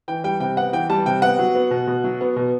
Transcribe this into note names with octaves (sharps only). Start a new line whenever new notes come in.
E3 G5
G3 G5
C3 G5
B3 F#5
E3 G5
G3 A5
C3 G5
B3 F#5
F#3
B3
B2
B2
F#3
B3
B2